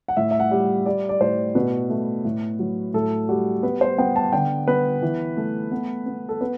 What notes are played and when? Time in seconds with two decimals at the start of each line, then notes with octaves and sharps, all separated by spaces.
0.08 F#5
0.17 A2 E5
0.31 E5
0.40 F#5
0.51 G3
0.86 G3 D5
1.09 D5
1.20 A2 C5
1.55 B2 B4
1.90 A3
2.25 A2
2.59 F#3
2.94 A2 A4
3.29 G3 F#4
3.63 B3 B4
3.81 C5
3.98 B3 G5
4.16 A5
4.33 D3 G5
4.68 B3 B4
5.02 E3
5.37 A3
5.72 B3
6.06 B3
6.29 A4
6.41 B3 B4